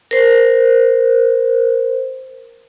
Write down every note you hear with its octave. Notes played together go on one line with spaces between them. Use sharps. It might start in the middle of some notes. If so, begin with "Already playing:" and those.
A#4 C5